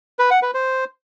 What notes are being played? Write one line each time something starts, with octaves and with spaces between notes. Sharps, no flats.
B4
F#5
B4
C5